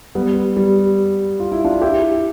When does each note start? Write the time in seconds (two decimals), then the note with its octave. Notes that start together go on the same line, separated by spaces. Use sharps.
0.15 G3 B3
0.57 G3
1.40 F4
1.52 E4
1.65 D4 F4
1.82 E4 G4